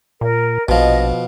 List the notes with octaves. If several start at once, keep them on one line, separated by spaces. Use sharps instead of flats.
A#2 A#4
A#1 B2 F3 D#5